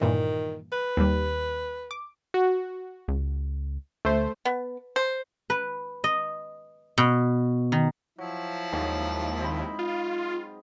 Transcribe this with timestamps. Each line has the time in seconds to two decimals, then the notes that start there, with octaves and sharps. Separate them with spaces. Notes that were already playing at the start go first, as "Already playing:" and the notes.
0.01 G2 A#2 D#3 E3
0.73 B4
0.97 D#2 G3
1.91 D6
2.34 F#4
3.08 C#2
4.05 D2 A3 C5
4.45 B3
4.96 C5
5.50 B4
6.04 D#5
6.98 B2
7.72 D#3
8.18 F3 F#3 E4
8.73 D#2 G#2 F#3
9.40 C4 D#5 B5
9.79 F4